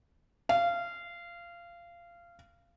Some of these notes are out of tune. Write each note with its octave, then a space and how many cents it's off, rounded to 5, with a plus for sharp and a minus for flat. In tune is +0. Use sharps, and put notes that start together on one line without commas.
F5 -20